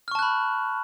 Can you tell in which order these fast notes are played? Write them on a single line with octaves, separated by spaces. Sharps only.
F6 C#6 A5 F#6 B5